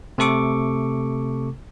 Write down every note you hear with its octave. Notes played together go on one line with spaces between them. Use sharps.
C3 A3 A4 C#6 D6